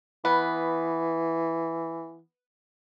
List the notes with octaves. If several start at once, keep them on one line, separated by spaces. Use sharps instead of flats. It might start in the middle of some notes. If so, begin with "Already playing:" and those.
E3 B3